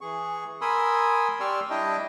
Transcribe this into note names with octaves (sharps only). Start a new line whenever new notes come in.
E3 G#4 C#6
A#4 G#5 B5 C6 D#6 E6
G4 D5 C6 C#6 E6 F6
G3 D4 E4 G4 D#5 G5